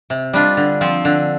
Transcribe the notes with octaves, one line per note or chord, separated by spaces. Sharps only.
C3
G3 D4 F4
D3
F3 C4
D3